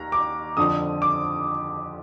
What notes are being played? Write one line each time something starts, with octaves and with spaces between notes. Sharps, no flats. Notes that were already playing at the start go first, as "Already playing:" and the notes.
Already playing: D#2 A#5
D6
F2 D3 F3 D#6
D6